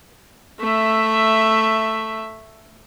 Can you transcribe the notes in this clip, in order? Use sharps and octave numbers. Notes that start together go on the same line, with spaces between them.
A3 E5